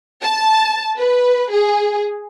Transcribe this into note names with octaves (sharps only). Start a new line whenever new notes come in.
A5
B4
G#4